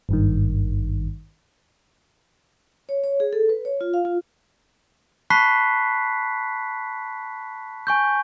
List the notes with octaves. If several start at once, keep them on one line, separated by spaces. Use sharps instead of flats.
G#1 G2 D#3
C#5
C#5
G#4
A4
B4
C#5
F4
F5
F4
A5 B5 C#6 F#6 B6 C7
G#5 C#6 G6